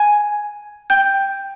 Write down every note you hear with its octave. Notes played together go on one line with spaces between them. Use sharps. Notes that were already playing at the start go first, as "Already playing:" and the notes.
Already playing: G#5 G#6
G5 G6